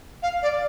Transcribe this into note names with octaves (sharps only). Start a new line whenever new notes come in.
F5
D5